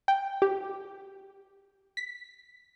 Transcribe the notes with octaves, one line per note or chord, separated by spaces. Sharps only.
G5
G4
B6